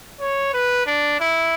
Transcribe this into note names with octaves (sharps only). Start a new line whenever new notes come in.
C#5
B4
D4
E4